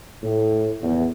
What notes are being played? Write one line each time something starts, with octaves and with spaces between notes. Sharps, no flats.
A2
E2